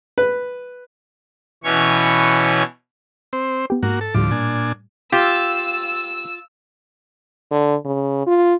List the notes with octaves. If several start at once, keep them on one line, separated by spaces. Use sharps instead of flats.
B4
B2 E3 C#4 C#5 C#6
C4 C5
B3 G4
G#2 A#3 F#4
A4
D2 A2 F3 G3 D6
A#2 D4 G#5
F4 G4 E6
D3
C#3
F4